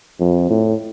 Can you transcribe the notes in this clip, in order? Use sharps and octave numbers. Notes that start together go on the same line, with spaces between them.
F2
A2